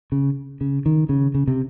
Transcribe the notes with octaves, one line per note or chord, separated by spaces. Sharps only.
C#3
C#3
D#3
C#3
C#3
C3